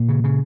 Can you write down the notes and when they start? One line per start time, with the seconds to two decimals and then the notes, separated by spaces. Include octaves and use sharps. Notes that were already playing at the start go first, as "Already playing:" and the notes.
Already playing: A#2 A#3
0.09 C#3
0.24 C#3